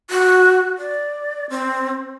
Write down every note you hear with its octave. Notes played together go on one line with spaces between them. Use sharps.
F#4
D5
C4